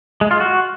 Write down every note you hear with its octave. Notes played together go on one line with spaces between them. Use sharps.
G#3
F4
F#4